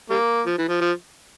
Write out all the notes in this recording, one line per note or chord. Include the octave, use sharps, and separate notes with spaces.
G3 A#3
F3
E3
F3
F3